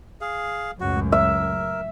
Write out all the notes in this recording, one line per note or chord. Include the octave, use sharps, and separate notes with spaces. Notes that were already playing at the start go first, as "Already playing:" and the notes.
G#4 F5
C#2 F#2 A2 F#4
A#4 E5